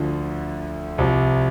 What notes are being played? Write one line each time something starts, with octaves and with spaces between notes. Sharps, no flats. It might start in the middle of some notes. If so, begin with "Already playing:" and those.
Already playing: D2 D3 F3
C2 C3 F3